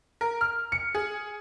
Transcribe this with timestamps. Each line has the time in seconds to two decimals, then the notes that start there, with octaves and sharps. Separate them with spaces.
0.21 A#4
0.41 F6
0.72 C#7
0.95 G#4